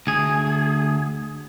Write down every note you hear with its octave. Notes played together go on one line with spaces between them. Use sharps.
D2 G#4